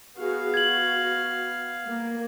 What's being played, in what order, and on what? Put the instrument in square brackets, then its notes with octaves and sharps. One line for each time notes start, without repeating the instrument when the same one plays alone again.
[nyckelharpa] B3 F5 [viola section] F#4 G#4
[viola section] F#4 [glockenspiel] G#6 F#7
[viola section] A#3